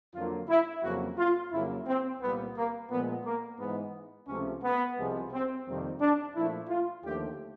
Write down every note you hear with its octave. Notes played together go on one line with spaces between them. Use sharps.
F2 D3 F#3 A#3 F4
E4
F2 C#3 F#3 A#3 F#4
F4
F2 C#3 F#3 A#3 E4
C4
C2 A#2 G3 A#3 B3
A#3
A#2 F3 G#3 B3
A#3
G#2 E3 G#3 B3
C#2 C3 F3 A3 C#4
B3
C2 C3 F3 G#3
C4
F2 C3 D#3 G3 A#3 C4
D4
A#2 F3 A3 E4
F4
D#2 D3 F3 A3 G4